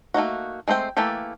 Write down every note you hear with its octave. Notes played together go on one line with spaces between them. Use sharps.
A3 A#3 D#4 F#4
G#3 A3 C4 C5 G5
E3 A3 A#3 G4 A4